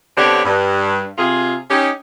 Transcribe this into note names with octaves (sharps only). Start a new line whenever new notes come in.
D3 B3 C4 D4 G4 C#5
G2
C3 F4 G#4
C#4 D#4 G4